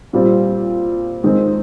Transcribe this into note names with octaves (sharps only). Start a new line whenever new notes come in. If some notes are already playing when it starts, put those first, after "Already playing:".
A#2 G3 C4
D#3 G#3 C4